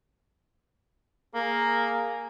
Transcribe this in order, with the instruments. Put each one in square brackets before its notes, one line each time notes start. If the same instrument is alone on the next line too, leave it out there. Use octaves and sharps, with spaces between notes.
[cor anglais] A#3 [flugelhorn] G#4